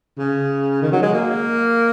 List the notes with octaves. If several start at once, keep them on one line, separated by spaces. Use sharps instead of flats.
C#3
D#3
F#3
G#3
A#3